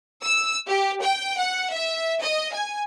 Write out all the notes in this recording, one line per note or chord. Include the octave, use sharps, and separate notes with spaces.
E6
G4
G5
F#5
E5
D#5
G#5